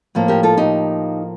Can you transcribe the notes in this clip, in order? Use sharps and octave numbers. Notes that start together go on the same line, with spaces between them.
A2 F3 A#3
G4 A#4
F4 A4
D#4 G4